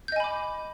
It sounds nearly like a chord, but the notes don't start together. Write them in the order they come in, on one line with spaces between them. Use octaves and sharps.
G6 D#5 G#5 B5 D6